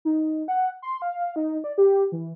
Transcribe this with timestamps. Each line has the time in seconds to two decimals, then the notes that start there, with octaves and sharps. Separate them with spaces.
0.05 D#4
0.48 F#5
0.82 C6
1.02 F5
1.36 D#4
1.64 D5
1.78 G4
2.12 E3